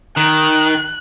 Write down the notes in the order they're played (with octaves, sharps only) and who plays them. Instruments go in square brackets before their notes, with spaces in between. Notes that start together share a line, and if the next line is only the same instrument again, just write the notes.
[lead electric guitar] D#3 [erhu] F#6